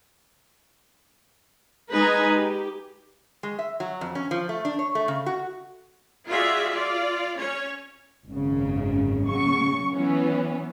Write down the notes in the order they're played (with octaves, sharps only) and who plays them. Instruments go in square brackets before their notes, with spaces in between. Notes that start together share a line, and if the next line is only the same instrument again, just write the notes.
[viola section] G#3 D#4 B4 G#5
G4
[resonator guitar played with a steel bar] G#3
E5
F#3
F2
C#4
F3
A3
D4
C#5
A3
C#3
F#4
[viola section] F4 F#4 G#4 D5 E5
F4 D5
C#4 C#5
[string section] G#1 F#2 C#3
C#3 F#3 C#6
E3 F#3 B3 C#4